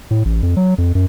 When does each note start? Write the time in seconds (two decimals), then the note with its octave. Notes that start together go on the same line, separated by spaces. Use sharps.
0.11 A2
0.25 A1
0.43 F2
0.57 F#3
0.78 F2
0.95 F#2